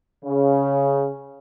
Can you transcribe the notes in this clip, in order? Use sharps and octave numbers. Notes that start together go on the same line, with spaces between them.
C#3